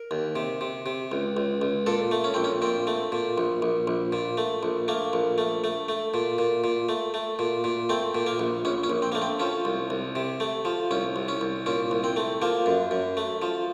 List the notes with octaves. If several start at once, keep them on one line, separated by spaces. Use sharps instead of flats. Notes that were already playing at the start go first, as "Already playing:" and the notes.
Already playing: A#4
D#2
C3
C3
C3
C#2
C#2
C#2
A#2 A4
A3
C#4
A#1 C4
C#4
A#2 C4
A3
A#2
A#1
A#1
A#1
A#2
A3
A#1
A3 A#3
A#1
A3
A3
A3
A#2
A#2
A#2
A3
A3
A#2
A#2
A3 C4
A#2
A#3
A#1
A#1 C#4
C#4
A#1
C4
A3 A#3
C4
F3 C#4
C2
C2
C3
A3
F3
C2 C#4
C2
C#4
C2
A#2 C#4
C2
C4
A3
F3 A#3
F#2
F#2
A3
F3